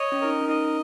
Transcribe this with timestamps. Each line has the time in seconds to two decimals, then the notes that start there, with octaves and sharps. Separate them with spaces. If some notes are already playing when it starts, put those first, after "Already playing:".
Already playing: C#5 D#5
0.12 C#4
0.21 D#4 A#4
0.30 C#4
0.41 C#4
0.48 D#4 D#5